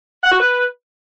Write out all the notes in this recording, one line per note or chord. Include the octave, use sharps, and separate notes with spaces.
F#5
F#4
B4